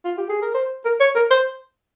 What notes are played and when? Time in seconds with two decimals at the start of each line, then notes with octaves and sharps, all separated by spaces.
0.05 F4
0.18 G4
0.30 G#4
0.42 A#4
0.54 C5
0.85 A#4
1.00 C#5
1.15 A#4
1.31 C5